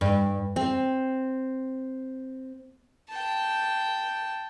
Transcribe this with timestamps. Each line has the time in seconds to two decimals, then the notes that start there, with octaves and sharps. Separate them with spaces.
0.01 G2
0.56 C4
3.09 G5 A5